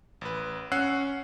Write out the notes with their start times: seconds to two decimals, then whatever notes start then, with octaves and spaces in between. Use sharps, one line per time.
0.21 A1 B4
0.72 C#4 F#5 E6 F#6 C7